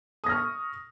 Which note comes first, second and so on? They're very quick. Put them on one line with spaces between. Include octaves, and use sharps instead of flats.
D#6 A#6 F6 C#6